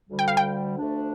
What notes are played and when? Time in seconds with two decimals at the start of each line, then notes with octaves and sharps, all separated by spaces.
0.09 D2 D3 G3
0.19 G5
0.28 F5
0.37 G5
0.78 D2 D3 F3 A3 D4